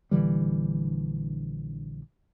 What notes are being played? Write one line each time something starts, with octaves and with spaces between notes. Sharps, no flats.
A#1 D3 E3 G3